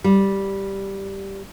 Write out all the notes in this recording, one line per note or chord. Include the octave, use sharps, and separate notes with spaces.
G3